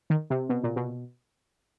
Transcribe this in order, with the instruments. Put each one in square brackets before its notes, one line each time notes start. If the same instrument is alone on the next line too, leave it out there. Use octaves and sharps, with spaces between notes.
[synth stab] D#3
C3
B2
A#2
B2